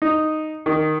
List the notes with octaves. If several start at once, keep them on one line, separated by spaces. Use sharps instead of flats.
D#4
D#3